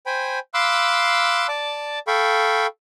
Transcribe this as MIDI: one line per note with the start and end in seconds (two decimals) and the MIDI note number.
0.06 0.39 72
0.06 0.39 79
0.06 0.39 80
0.06 0.39 83
0.54 1.47 77
0.54 1.47 83
0.54 1.47 84
0.54 1.47 86
0.54 1.47 88
0.54 1.47 90
1.48 1.99 74
1.48 1.99 81
1.48 1.99 86
2.07 2.67 69
2.07 2.67 77
2.07 2.67 79
2.07 2.67 83
2.07 2.67 85